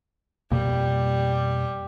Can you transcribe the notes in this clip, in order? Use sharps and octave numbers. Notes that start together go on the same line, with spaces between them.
F2 B2 G3 A#3